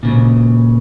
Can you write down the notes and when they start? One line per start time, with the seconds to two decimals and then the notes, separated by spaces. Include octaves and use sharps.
0.03 A#2 C#3